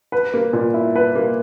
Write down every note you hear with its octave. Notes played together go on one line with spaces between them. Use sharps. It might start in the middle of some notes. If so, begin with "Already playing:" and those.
B4
A#3
A#2
E4
B4
A#3